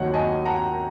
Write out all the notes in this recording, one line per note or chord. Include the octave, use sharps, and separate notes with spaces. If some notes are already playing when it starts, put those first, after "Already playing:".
Already playing: D#2 D#3 F#3 C#5 F#5
D#5 G#5
F#5 A#5